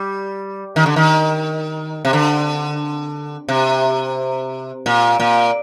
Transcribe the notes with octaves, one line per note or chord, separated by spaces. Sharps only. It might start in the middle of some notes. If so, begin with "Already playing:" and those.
Already playing: G3
D#3
D3
D#3
C3
D3
C3
A#2
A#2